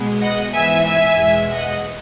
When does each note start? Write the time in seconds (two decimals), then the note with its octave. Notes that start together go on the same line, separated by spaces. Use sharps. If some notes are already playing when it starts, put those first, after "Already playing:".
Already playing: B2 G#3 B3
0.21 D#5 F#5
0.53 G#2 E3 B3 E5 G#5
0.86 E5 G#5
1.19 E2 B2 G#3
1.51 D#5 F#5